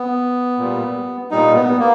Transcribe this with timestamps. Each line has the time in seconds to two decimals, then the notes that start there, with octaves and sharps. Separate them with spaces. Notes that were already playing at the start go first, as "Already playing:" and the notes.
Already playing: B3
0.59 A#2 G3
1.31 A#2 G3 D#4
1.55 B3
1.79 A#3